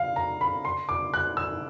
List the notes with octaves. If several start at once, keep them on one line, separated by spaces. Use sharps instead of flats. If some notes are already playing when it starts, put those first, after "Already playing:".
Already playing: F5
A#5
B5
C6
D6
F#6
E6